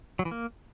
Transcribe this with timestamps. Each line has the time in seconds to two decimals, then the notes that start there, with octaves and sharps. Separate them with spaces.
0.19 F#3
0.25 E3
0.31 A#3